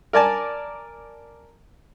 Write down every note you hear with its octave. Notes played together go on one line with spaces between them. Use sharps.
A#4 D5 G#5 A5